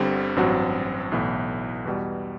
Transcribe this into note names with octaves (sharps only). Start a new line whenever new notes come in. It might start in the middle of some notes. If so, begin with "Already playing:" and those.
Already playing: G1 G2 D3 G3 C4
A1 G2 F#3 C4 F#4
B1 A2 E3 B3
E2 B2 G3